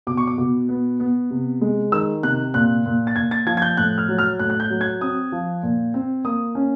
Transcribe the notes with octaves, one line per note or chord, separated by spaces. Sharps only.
B2 D6
C#6
D6
B2
B3
B3
C3
G#3
D#3 E6
C3 F#6
A#2 F#6
A#2
A6
A#2 G#6
A6
F3 G#6
G#6
G6
A2 F#6
F6
F#3
F6
A2 F#6
F#6
G6
F#3
G#6
C4 D#6
F3
A#2
C4
A#3 D#6
C#4